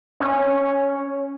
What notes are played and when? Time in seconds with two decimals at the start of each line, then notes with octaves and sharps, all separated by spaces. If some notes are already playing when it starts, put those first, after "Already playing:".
0.20 C#4